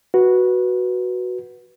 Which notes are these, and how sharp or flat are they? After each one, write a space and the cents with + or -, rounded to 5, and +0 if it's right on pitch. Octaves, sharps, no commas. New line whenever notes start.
F#4 +0 B4 -15